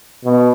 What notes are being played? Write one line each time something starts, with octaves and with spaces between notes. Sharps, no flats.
B2